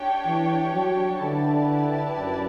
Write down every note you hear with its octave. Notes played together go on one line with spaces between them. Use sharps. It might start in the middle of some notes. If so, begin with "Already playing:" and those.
Already playing: D4 G4 C#5 G5
E3
F#3
D3 E4 G4 B4 D5 A5
F#2